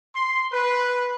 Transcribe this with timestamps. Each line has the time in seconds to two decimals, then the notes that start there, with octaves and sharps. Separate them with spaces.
0.15 C6
0.52 B4